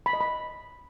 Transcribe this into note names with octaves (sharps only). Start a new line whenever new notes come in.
B5
D#5
B5